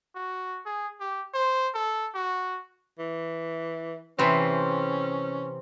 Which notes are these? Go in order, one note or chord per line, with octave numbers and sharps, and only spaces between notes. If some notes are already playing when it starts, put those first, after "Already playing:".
F#4
G#4
G4
C5
A4
F#4
E3
C3 E3 C4 C#4